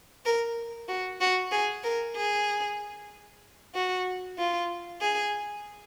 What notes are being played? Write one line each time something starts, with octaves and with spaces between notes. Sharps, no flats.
A#4
F#4
F#4
G#4
A#4
G#4
F#4
F4
G#4